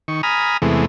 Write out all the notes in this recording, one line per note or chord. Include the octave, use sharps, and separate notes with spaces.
D#3 C#6
G#5 A#5 B5 D#6 F6
E2 C3 E3 G#3 A3 B3